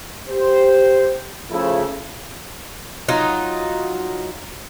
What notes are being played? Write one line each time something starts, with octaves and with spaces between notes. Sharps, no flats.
G4 C5
C#3 F3 A3 E4
F#3 D#4 F4